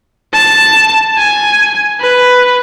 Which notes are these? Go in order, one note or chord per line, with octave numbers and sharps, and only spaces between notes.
A5
G#5
B4